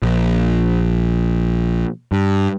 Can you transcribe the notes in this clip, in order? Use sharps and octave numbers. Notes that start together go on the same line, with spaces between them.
A#1
G2